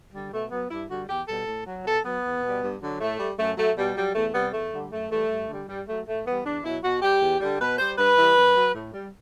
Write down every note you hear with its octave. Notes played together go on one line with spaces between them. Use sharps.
D3 G3
B2 A3
F#3 B3
G2 E4
D3 G3 F#4
E2 G4
B2 G3 A4
A2
F#3
B2 A4
F#3 B3
E2
B2 G3
G2
D3 F#3
A2 A3
G3
F#2 A3
F#3 A3
B2 G3
F#3 G3
E2 A3
C3 G3 B3
E2 A3
D3 G3
F#2 A3
E3 G3 A3
G2
D3 G3
G2 G3
F#3 A3
A2 A3
E3 G3 B3
E2 D4
B2 F#3 E4
B2 F#4
G3 G4
E2
D3 G3
B2 B4
G3 C5
G2 B4
E3 G3
F#2
F#3
A2
G3